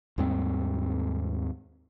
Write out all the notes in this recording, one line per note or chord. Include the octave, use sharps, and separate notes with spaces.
D#2 G#2 G3 C4